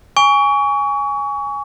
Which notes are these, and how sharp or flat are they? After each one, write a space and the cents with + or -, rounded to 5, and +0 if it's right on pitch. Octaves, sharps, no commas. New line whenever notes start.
G#5 -10 C#6 +30